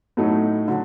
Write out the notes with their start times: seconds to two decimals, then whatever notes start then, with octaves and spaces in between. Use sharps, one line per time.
0.17 A2 F#3 A3 D#4
0.68 D3 F#3